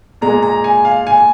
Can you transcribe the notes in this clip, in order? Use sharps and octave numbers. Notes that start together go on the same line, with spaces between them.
A#2 G#3 A#5
A#5
G#5
F5
G#5